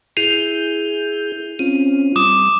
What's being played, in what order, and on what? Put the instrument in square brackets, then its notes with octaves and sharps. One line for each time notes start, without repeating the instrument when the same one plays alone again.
[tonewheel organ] E4 G#4 G6 [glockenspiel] C7 D#7 F7
[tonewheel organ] C4 C#4 F4 [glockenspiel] D#7
[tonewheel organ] G3 [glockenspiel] D6 D#6 E7